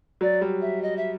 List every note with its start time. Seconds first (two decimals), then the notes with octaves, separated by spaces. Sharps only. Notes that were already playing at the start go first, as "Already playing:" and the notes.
0.21 F#3 D5
0.41 G3
0.61 E5
0.82 D#5
0.96 E5